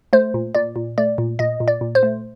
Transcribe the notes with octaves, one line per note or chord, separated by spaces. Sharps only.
A3 C5
A#2
A#2 D5
A#2
A3 D5
A#2
A#2 D#5
A#2
D5
A#2
C5
A3